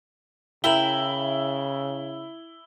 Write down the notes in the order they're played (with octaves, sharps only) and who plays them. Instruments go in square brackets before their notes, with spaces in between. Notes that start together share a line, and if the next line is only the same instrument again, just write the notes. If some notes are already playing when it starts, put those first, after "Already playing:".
[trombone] C#3 [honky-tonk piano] E4 [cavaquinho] A#4 E5 G5 [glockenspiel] F#7 G7